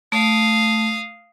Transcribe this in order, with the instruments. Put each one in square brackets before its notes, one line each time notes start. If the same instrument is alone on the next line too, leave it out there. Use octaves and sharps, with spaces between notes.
[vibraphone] A3 [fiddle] F5 D#6